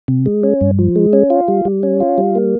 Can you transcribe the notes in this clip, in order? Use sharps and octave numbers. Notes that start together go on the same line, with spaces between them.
C3
G#3
C#4
G2
F3
G#3
C#4
F4
G3
G3
C#4
F4
G3
A#3